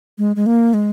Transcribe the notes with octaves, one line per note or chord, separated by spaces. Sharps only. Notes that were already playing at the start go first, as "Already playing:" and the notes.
G#3
G#3
A#3
G#3